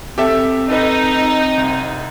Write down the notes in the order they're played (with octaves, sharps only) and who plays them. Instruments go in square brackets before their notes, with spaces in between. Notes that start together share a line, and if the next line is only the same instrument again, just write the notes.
[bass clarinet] C4 [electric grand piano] G4 A4 E5
[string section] D#4 [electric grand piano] A4 B4 D#5
[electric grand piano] C2